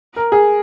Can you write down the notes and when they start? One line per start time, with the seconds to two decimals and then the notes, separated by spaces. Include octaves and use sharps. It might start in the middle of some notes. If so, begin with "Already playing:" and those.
0.16 A#4
0.32 G#4